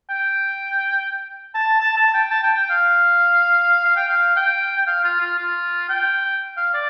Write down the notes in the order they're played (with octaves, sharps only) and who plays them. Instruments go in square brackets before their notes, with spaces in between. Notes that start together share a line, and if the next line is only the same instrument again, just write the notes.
[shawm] G5
A5
A5
A5
G5
A5
G5
G5
F5
F5
G5
F5
G5
G5
F5
F4
F4
F4
G5
F5
D5